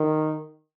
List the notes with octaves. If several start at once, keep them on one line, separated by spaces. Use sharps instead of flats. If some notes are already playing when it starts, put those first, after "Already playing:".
Already playing: D#3